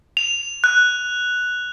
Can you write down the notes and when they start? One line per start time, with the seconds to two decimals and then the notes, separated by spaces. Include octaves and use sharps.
0.17 F7
0.64 F#6